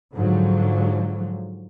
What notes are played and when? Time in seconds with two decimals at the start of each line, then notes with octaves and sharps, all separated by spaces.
0.14 G#2 D3 F3 F#3